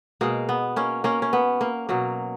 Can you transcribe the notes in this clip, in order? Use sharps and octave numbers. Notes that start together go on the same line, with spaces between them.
B2 G#3 A#3
B3
A#3 C#4
A#3 C#4
C#4
B3
A#3
B2 F#3 A#3